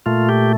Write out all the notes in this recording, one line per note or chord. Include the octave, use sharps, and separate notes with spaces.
A#2 A3 F4
G4